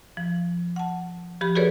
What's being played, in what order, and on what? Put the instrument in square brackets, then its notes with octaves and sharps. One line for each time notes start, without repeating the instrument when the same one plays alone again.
[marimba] F3
F#5 A5
F3 G4 B5
F#4 G#4 A4 B4 C#5 D5